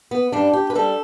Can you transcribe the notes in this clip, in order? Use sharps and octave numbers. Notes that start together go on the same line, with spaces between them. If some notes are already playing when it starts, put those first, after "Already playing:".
B3
G2 G3 D4
G4
B4
G3 A4